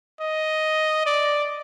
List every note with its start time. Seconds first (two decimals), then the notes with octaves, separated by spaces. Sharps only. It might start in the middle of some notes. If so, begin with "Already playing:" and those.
0.21 D#5
1.06 D5